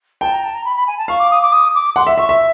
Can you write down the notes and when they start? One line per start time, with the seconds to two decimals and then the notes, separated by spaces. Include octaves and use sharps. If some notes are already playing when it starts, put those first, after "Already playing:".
0.21 G5 A5
0.32 A#5
0.43 A5
0.54 A#5
0.65 B5
0.75 B5
0.87 G#5
0.97 A5
1.08 F5 C#6
1.19 D6
1.31 D#6
1.42 D6
1.52 D#6
1.74 D6
1.96 F#5 C6
2.07 E5
2.18 E5 C#6
2.29 E5